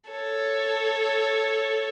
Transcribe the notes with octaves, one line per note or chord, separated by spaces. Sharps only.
A4 C#5